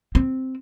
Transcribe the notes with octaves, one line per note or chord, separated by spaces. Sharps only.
C4